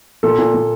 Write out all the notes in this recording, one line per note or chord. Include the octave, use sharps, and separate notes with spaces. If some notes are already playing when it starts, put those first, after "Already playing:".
A#2 A4
A#2
A#2